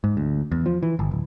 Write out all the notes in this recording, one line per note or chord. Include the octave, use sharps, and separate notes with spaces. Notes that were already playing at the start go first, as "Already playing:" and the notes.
G#2
D2
E2
F3
E3
G1
D1